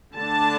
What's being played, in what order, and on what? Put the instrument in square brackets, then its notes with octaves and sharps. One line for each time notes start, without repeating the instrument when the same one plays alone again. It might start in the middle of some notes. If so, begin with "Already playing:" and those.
[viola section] D3 A3 D4 A5